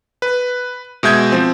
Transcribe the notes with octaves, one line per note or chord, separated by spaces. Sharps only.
B4
B2 G#3 E5 G6 G#6
F3 C4